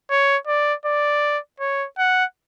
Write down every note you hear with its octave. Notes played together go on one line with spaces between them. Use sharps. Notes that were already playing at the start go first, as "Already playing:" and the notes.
C#5
D5
D5
C#5
F#5